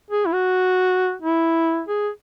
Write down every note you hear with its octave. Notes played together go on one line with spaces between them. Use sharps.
G#4
E4
F#4
E4
G#4